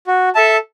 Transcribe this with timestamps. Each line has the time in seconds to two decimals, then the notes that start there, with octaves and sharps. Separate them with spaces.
0.07 F#4
0.35 A4 E5 A5